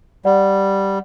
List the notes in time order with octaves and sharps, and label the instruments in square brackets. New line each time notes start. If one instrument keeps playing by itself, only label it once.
[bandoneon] G3 [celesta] D5 F#5